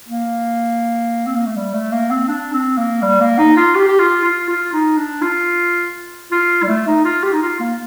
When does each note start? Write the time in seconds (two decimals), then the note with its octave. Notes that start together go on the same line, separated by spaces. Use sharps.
0.08 A#3
1.26 C4
1.36 A#3
1.46 A3
1.56 G3
1.74 A3
1.92 A#3
2.11 C4
2.28 D4
2.53 C4
2.77 A#3
3.02 G3
3.20 A#3
3.38 D#4
3.57 F4
3.75 G4
3.88 G4
3.99 F4
4.24 F4
4.48 F4
4.73 D#4
4.98 D4
5.22 F4
6.32 F4
6.63 G3
6.68 A3
6.87 D#4
7.04 F4
7.23 G4
7.33 D#4
7.41 F4
7.60 A#3